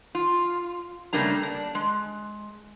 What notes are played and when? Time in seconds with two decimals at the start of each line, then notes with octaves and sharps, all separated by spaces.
0.15 F4
1.13 C#3 G3 A3 A#3 D4 A#5
1.43 D4
1.75 G#3